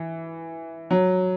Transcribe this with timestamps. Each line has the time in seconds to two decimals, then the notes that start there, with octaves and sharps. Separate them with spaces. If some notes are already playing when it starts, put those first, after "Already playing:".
Already playing: E3
0.91 F#3